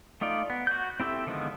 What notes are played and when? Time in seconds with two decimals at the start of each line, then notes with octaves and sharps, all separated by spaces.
0.21 A3 D#4 F4 D5
0.50 B3
0.67 F#4 G6
1.00 C4 E4 G4 A4 E5
1.27 D3 D#3 F3 G#3 B3